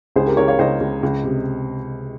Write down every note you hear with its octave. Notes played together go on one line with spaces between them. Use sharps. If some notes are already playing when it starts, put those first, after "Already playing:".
C#2 G#4 C5
G4 A#4
C#2 A#4 C#5
C#5 F5
C#2 C5 D#5
C#2
C#2
C3